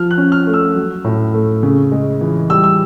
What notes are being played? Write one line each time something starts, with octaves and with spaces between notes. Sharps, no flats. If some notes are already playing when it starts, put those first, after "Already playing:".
Already playing: F3 F6
F#6
C#4
F6
A3
E6
F#3
A2
A3
C#3
G#3
E3
G3 E6
E6